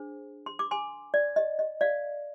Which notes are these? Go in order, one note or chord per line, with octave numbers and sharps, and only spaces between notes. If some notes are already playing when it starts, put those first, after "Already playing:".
Already playing: D4 G#4 C5
C6
D6
G#5 C6
D5
D#5
D#5
D5 F5